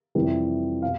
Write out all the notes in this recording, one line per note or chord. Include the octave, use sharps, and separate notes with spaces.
F2 C3 E3 G3 C4
B2 F5